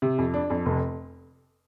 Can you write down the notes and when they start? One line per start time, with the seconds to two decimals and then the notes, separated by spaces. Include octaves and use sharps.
0.02 C3
0.18 F2
0.34 D4
0.50 F2
0.66 F1